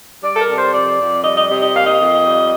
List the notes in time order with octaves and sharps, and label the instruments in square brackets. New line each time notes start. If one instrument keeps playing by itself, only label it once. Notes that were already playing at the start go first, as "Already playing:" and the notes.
[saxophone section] G3 D5
A4
A#4
C3
C5
F2 D5
F2
G3 D#5
D#5
C3 D#5
D#5
A#3 F5
D#5
F2
G3